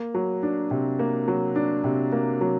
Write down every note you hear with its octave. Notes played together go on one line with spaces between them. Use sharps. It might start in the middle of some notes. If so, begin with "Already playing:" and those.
Already playing: A#3
F#3
D4
C3
A#3
F#3
D4
C3
A#3
F#3